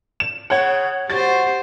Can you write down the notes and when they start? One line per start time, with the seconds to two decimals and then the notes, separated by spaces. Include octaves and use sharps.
0.20 E7
0.50 C#3 C#5 F#5
1.10 F#4 G4 C5 A6